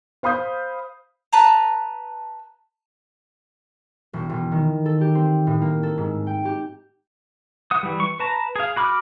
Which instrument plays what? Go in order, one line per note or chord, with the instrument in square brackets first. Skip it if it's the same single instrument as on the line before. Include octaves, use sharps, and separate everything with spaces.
[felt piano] C5 F5 B5 D#6 G6
[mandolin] B4 A5 A#5
[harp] E1
E1
D#3
A4
G4
C4
A2
A#3
A4
G#2
G5
G4
[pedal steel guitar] F#5 D#6
E3 G3
C#6
B4 A5 A#5
G#4 F5
F#4 B5 D6 F6